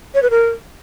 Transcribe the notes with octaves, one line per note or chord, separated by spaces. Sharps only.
C#5
B4
A#4